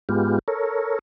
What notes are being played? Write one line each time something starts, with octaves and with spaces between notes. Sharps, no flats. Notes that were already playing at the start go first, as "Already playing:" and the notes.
G#2 G#3 B3 F4 G4
A4 A#4 C#5